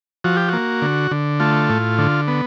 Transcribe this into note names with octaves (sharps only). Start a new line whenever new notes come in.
F3 F#4
G4
A#3 F#4
D3
D3
A3 F4
A2
D3
B3